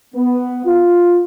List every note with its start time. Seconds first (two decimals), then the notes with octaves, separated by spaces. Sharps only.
0.15 B3
0.65 F4